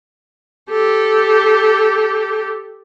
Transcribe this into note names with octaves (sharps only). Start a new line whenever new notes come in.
G4 A4